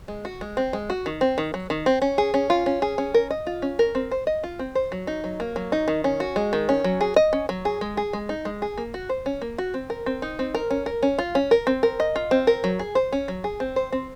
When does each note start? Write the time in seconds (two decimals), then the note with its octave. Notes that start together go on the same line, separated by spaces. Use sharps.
0.08 G#3
0.25 F#4
0.41 G#3
0.57 C4
0.73 G#3
0.90 F#4
1.06 D#3
1.21 C4
1.38 D#3
1.54 F#3
1.70 D#3
1.86 C4
2.02 C#4
2.18 G#4
2.34 C#4
2.50 F4
2.66 C#4
2.82 G#4
2.98 C#4
3.14 A#4
3.31 D#5
3.47 F4
3.62 C#4
3.79 A#4
3.95 C4
4.11 C5
4.27 D#5
4.44 F4
4.59 C4
4.75 C5
4.92 F#3
5.07 D#4
5.24 F#3
5.40 A#3
5.56 F#3
5.72 D#4
5.88 D#3
6.04 C#4
6.20 F#4
6.36 G#3
6.53 D#3
6.69 C#4
6.84 F#3
7.01 G#4
7.16 D#5
7.33 C#4
7.49 F#3
7.65 G#4
7.81 G#3
7.97 G#4
8.13 G#3
8.29 D#4
8.45 G#3
8.62 G#4
8.78 A#3
8.94 F#4
9.09 C5
9.26 C#4
9.42 A#3
9.58 F#4
9.74 C4
9.90 A#4
10.06 C4
10.22 D#4
10.39 C4
10.55 A#4
10.71 C#4
10.86 A#4
11.03 C#4
11.19 F4
11.35 C#4
11.51 A#4
11.67 C4
11.83 A#4
12.00 D#5
12.16 F4
12.31 C4
12.47 A#4
12.64 F#3
12.79 G#4
12.95 C5
13.13 C#4
13.28 F#3
13.44 G#4
13.60 C4
13.76 C5
13.92 C4